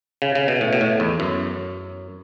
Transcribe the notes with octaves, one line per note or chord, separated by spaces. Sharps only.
C#3
C#3
B2
A2
B2
A2
E2
F#2